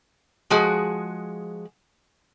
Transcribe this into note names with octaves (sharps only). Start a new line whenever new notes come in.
F3 G#3 F#4 G#4